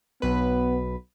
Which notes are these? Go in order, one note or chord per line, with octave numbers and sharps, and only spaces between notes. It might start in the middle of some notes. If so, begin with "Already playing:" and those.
B1 B3 B4